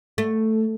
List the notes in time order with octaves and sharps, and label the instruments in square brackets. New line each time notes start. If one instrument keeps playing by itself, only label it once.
[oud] A3